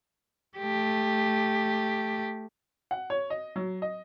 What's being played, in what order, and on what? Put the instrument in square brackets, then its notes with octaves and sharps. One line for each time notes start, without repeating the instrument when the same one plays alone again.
[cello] A3 G4
[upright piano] F#5
C#5
D#5
F#3
D#5